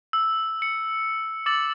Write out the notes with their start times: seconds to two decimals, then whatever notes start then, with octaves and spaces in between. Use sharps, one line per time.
0.13 E6
0.62 C#7
1.46 D6 E6 A6 F#7